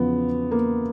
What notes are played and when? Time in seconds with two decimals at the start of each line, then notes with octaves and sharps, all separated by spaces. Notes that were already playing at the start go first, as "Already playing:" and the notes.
Already playing: E2 C#3 F3 B3
0.51 A#3